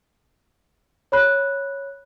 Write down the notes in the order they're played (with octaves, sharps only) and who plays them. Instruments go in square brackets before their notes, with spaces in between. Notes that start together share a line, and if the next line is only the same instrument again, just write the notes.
[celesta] C#5 B5 F#6